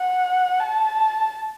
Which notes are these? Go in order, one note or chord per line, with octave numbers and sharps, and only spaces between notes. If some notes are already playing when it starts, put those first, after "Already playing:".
Already playing: F#5
A5